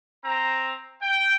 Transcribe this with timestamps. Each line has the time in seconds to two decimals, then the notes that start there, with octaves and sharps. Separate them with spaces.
0.25 C4 A#5
1.02 G5